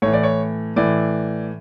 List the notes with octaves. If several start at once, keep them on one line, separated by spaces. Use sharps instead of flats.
A2 E3 C#5
D5
C#5
A2 E3 D5